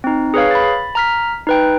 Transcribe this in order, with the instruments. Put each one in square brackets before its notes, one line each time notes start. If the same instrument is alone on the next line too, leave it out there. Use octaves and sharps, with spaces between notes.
[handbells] C4 D#4
G#4 B4 C#5 F5
B5 A6
A#5 F6 B6
D#4 B4 G5